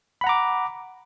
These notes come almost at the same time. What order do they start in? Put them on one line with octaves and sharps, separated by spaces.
B5 F#5 A#5 D6